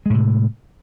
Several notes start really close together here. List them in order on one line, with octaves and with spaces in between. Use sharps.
G#3 A2 C3